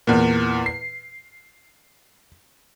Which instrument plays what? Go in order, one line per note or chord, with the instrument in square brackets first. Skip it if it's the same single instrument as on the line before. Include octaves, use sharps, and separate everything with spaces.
[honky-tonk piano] E2 A#2
C7